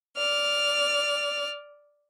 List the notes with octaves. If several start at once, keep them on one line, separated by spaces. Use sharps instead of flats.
D5 F6